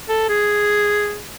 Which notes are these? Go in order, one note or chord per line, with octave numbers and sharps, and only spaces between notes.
A4
G#4